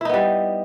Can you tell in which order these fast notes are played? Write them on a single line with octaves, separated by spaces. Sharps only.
E4 D#4 B3 G3